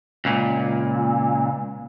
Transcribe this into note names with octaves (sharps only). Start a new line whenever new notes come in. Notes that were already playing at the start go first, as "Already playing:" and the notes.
C#2 A#2